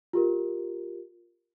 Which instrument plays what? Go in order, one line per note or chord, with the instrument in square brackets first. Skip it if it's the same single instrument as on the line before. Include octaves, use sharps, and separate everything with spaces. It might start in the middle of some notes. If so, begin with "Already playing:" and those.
[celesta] F4 G4 A#4